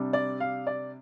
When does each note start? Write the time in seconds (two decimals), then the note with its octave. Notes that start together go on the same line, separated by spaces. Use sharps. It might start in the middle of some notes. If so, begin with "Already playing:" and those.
Already playing: C3 G3 D4
0.13 D5
0.40 F5
0.67 D5